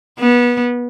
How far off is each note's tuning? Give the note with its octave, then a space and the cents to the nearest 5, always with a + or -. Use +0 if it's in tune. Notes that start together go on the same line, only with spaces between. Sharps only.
B3 -25